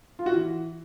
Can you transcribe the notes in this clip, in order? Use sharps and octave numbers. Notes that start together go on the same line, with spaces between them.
F4
F#4
E3